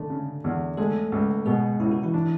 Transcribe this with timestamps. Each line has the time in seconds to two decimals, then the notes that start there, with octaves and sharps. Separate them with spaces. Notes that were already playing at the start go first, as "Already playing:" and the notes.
Already playing: D3 A3 D4
0.10 C#3
0.44 E2
0.77 G#3 A3 A4
1.12 C#2
1.45 B2 G#3 G#4
1.80 C#2 E4
1.91 F#4
2.03 E3 E4
2.14 D4